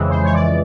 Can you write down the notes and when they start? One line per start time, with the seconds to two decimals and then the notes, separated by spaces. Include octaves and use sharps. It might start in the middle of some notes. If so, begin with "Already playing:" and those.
Already playing: F2 C#3 E3 G#3
0.10 C5
0.24 C#5
0.34 D5